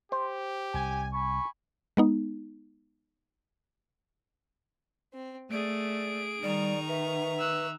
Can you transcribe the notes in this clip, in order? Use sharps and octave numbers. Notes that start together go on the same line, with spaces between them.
G4 C5
C2 G#5
G#5 B5 C#6
G#3 B3 D#4
C4
A3 G#4 D5 D7
D#3 G3 D5 A#5 C#6
B4 E5
E6 F#6